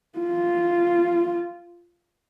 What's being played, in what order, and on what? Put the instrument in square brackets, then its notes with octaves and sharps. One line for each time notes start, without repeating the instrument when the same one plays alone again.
[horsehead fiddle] F4